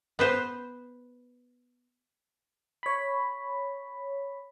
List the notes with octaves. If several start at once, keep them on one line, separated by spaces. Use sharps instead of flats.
B3 B4 C5
C#5 B5